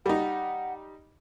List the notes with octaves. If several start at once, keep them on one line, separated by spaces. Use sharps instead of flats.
G3 D#4 F#5